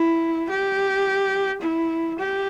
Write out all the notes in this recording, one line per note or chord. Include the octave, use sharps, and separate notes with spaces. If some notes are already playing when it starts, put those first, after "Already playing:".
Already playing: E4
G4
E4
G4